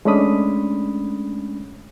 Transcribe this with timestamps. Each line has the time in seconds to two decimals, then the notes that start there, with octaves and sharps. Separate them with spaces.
0.05 G#3 A3 C#4 D4 B5 D#6